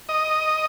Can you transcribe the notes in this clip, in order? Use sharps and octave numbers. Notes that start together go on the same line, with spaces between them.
D#5